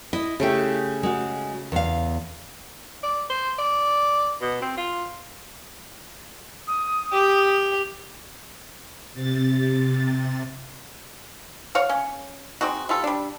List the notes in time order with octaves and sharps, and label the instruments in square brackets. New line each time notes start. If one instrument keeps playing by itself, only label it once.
[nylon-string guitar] E4 [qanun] D#5
[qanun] C#3 A3 G4 [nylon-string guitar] E4
[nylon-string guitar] G#3 F#4
E2 F5
[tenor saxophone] D5
C5
D5
B2
C4
F4
[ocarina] D#6
[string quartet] G4
[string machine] C3 A6
[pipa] C#5 F5 F#5
C#4
G#3 C4 D#4 F#4
G3 F4 A4
G3 D4